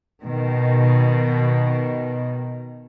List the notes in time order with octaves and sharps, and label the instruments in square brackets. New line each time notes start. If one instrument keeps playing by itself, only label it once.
[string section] B2 D#3